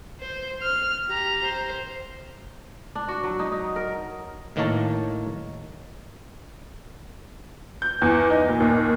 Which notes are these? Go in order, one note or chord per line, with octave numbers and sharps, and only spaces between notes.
C5
F6
G4 A#5
C5
D4
F#4
F#3
D#4
D#4
A#4
A2 D#3 A#3 A#4 C#5 A5
G6
E2
D#4
A#2
D#2